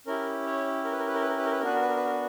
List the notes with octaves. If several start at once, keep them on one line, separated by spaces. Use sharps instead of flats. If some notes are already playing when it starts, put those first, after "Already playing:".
C#4 E4 G4 A#4
C#5
A#4
B4
A#4
B4
A#4
B4
A#4
B4
A#4
B4
A#4
B3 D4 F#4 B4
A#4
B4
A#4
B4
A#4
B4